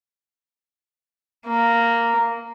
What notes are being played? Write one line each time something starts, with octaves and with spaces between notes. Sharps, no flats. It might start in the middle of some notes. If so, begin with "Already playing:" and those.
A#3